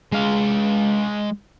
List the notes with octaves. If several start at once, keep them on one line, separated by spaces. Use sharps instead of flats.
G#3 F5